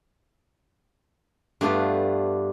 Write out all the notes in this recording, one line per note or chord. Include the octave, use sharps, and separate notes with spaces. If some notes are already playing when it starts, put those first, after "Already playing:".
G2 A3 B3 D4 F4